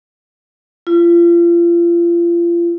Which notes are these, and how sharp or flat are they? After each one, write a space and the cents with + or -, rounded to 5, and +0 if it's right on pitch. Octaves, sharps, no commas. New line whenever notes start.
F4 -35